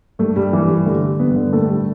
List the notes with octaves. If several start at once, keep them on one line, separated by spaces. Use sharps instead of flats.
G2 A3
G2 G3
E3
G2
G3
D3 A3
G3
G2 B3 B4
D3
A2 A3 A4
G3